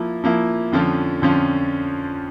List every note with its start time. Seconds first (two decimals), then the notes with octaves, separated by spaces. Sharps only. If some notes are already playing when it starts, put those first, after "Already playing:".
Already playing: F3 A#3 E4
0.24 F3 A#3 E4
0.72 F2 D3 F3 C#4 F4
1.22 F2 D3 F3 C#4 F4